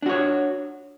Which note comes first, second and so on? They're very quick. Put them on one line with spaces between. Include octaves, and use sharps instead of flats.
D4 F#4 C#5